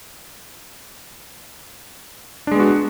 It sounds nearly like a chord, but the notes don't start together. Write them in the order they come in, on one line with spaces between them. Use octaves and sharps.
D4 G#3 B3 F#4